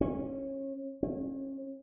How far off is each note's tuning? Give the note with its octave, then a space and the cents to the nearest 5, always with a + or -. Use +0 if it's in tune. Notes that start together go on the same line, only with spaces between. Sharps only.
C#4 -30
C#4 -35